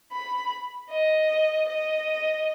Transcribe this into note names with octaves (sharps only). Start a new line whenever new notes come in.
B5
D#5
D#5